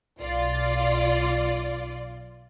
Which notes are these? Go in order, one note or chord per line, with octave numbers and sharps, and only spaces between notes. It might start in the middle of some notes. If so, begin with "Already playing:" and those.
B1 F4 D5